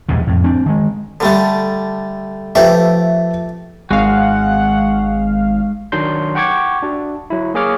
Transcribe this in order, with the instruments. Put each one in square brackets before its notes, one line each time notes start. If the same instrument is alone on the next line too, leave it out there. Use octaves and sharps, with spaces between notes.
[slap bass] A#1 E2 G#2 C3
F2 A2
C4 D4
D#3 G#3
[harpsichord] D3 G3 A3
[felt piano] F3 B4 E5 [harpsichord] A3 G4
[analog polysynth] G#1 F5 [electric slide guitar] G#3 F#4 [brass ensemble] F#5
[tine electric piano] D#3 F#3 D4 C6 G6
F#5 G5 C#6 D6 G#6
D4 F#4
F#3 E4
A#3 G#4 C#5 D6 F6